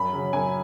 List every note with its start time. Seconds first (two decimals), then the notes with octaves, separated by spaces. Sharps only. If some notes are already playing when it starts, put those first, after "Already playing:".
Already playing: F#2 B5
0.13 C#3 F#3 C#4
0.33 F#2 G#5